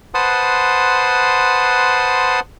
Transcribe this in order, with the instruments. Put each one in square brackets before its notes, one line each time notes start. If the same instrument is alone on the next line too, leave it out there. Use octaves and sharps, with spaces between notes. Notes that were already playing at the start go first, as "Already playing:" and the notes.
[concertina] B4 C5 F#5 A5 C6 D#6